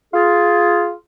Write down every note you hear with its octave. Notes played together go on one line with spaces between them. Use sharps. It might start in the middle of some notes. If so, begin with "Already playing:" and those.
F4 G#4